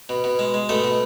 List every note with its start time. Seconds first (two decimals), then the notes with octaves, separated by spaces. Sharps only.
0.09 B2
0.24 B2
0.39 G#3
0.54 G#3
0.69 B2 A3 A4
0.84 B2